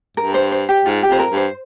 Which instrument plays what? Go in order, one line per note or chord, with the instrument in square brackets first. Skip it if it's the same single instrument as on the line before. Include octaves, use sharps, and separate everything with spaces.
[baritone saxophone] G2 [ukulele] A#4
[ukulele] C5
C5
G4
[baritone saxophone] G#2 [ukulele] F4
[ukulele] G4
[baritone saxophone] F2 [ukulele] C5
[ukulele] A#4
[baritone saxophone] G2
[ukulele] C5